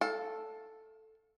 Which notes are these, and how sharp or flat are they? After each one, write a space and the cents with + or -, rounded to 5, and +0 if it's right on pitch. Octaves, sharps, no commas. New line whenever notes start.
A4 +0 F5 +30